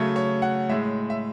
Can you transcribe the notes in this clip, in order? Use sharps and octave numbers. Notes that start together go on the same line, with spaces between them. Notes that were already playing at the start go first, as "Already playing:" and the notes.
Already playing: C#3 F#3 A3 C#5
C#5
F#5
A2 G#3 E5
E5